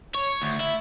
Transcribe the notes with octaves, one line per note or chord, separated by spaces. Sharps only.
C#5
D2
E4